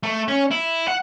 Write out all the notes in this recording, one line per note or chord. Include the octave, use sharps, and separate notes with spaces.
A3
C#4
E4
F#5